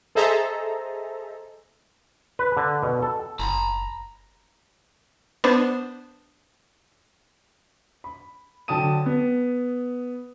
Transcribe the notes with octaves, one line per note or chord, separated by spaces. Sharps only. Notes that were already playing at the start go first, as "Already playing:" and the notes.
G#4 A4 C5 D#5 E5 A#5
B4
D3
B2
A4
F#1 A#5 B5
B3 D4 C5
B5
D3 F#3 G5 A5 D#6 D#7
B3